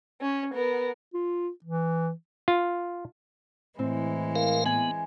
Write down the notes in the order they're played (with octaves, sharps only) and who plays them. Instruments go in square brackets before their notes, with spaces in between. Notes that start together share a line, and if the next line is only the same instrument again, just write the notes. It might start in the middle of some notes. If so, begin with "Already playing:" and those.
[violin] C#4
B3 A#4
[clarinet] F4
E3
[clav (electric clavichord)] F4
[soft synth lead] A2 [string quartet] E3 G#3 [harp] C4
[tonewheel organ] A#4 F5
[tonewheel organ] B3 [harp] G#5